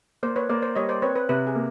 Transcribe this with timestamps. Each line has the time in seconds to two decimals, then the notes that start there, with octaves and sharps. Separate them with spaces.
0.23 A#3 C5 D5
0.36 B4 C#5
0.49 A#3 C5 D5
0.62 C5 D5
0.75 G3 C#5 D#5
0.89 C5 D5
1.02 C4 B4 C#5
1.16 B4
1.29 C3 B4
1.47 G#4
1.55 A#3